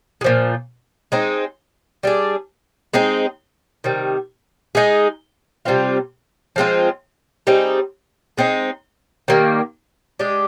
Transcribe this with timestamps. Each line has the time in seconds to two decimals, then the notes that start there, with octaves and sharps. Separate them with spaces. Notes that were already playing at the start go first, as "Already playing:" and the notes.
0.21 G#3
0.24 A#2 F3
1.12 G#3 C4 D#4
2.03 G3 D4 G#4
2.94 G#3 C4 D#4 G#4
3.84 C3 D#3 G3
4.75 G#3 D#4 G#4
5.65 C3 G3 C4 F4
6.56 F3 G#3 C4 F4
7.47 G3 C4 D#4 G#4
8.38 G#3 C4 D#4
9.28 D#3 G3 A#3
10.19 G#3 D4 G4